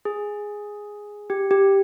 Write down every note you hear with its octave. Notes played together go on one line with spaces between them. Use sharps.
G#4
G4
G4